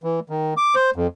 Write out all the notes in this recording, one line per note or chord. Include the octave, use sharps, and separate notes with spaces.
E3
D#3
D6
C5
F2